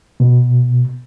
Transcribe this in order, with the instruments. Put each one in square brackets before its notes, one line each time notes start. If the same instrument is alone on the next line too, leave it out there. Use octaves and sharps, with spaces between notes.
[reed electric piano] B2